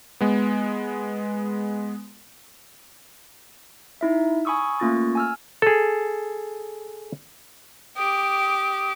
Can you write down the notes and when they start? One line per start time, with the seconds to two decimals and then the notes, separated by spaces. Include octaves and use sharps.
0.21 G#3 B3
4.01 D#4 E4 E5
4.45 G#5 B5 C#6 D#6 E6
4.80 A3 A#3 C#4 F4 C#6 A6
5.15 G#5 E6 F6
5.62 G#4 A4
7.97 G4 D6 D#6